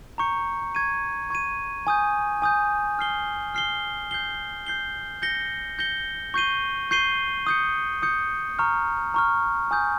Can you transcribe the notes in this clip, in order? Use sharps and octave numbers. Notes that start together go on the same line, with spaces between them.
A#5 C#6 G6 C#7
C#6 G#6 D#7
C#6 G#6 D#7
G#5 D#6 G6
G#5 D#6 G6
F6 C7 G7
F6 C7 G7
G6 C7 G7
G6 C7 G7
G6 A#6 C#7 G7
G6 A#6 C#7 G7
C#6 G6 C7 D#7 G7
C#6 G6 C7 D#7 G7
D#6 G6 C#7
D#6 G6 C#7
A#5 C#6 F6
A#5 C#6 F6
G#5 D#6 G6